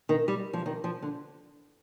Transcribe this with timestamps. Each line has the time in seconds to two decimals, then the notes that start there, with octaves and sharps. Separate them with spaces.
0.09 D#3
0.28 G3
0.53 F3
0.66 D#3
0.84 F3
1.02 D3